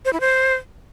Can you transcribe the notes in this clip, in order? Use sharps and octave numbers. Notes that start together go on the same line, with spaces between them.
C5
E4
C5